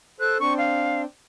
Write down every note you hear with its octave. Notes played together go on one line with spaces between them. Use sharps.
A4 C5 F#6
C4 D4 C#6
F5